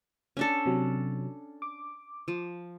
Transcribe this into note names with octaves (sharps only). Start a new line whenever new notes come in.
C#4 D4 A4
C3 F#3
D6
F3